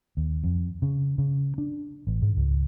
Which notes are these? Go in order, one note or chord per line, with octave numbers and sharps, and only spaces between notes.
D#2
F2
C#3
C#3
D4
A1
G#2
C#2